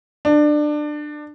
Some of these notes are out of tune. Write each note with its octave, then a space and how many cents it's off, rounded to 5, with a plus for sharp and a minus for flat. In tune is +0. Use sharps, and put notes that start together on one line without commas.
D4 +20